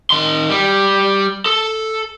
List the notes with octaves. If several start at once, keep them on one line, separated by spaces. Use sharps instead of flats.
D#3 C6
G3
A4